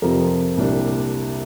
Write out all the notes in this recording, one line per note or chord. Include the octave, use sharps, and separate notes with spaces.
F2 C3 F3 C4 A#4
C2 A#2 G3 D4